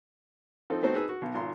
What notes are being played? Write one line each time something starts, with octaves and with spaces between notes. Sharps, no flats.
F3 C4 D#4 A4
A3 B3 C4 D#4 F#4 C5
D#4 G#4 B4 A5 E6
F#4
B1 B2
G#1 F4 A#5 C6